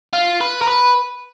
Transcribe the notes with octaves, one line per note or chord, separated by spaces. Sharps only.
F4
B4
A#4
B4